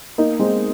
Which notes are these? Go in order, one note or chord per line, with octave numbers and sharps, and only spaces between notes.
A#3 D#4
G#3 C4